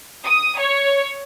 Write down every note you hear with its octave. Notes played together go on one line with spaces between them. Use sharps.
D#6
C#5